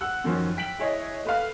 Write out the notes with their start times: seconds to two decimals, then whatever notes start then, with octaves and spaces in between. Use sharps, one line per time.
0.01 F#5 E6 F#6
0.24 F#2 D#3 F3 F#3 C#4
0.57 G5 B6 D7 F#7
0.79 E4 G#4 C#5 D#5
1.25 A3 B4 F5